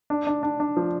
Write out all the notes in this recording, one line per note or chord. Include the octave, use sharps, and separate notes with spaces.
D4
D4
D4
D4
F3